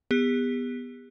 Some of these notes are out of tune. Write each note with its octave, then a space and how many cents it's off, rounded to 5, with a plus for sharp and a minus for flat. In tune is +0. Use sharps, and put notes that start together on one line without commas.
B3 +0 G4 +45